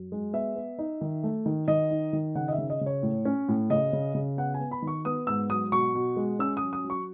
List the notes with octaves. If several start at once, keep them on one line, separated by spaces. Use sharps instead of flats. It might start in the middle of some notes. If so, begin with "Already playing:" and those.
Already playing: F#2
G#3
B3 E5
B3
D#4
D#3
A3
D#3
D#3 D#5
D#4
D#3
C#3 F#5
D#5
E5
C#3
D#5
C#3
C#5
A2
C#4
A2
C#3 D#5
C#3
C#3
B3 F#5
G#5
B3
B5
D#3
C#6
B3 D#6
G#2 E6
F#3 D#6
B2 C#6
B2
G#3
C#4 E6
D#6
F#3
D#6
F#3
C#6